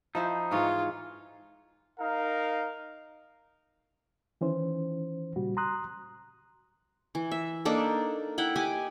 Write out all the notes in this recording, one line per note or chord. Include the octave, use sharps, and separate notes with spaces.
F3 D#4 E4 C5
G#2 E3 F4 C#5
D#4 A#4 F5
D#3 E3 C#4 C5
A#2 C#3 G3 F#4
A#5 C6 D#6 F#6
E3
E5
A#3 D4 D#4 A4
E4 F#5 G5
G4 D#5 G#5 D6